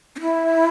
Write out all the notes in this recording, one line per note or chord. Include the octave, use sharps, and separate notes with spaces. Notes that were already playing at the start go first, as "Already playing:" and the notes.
C#4
E4